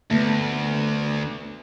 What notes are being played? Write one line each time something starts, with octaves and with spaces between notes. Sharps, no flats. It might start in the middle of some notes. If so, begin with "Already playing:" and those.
D2 A3 B3